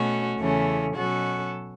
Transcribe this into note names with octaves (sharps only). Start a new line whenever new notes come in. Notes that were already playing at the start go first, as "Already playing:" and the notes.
Already playing: B2 A3 C#4 F#4
E2 C#3 E3 A3 C#4
B2 F#3 C#4 F#4 A4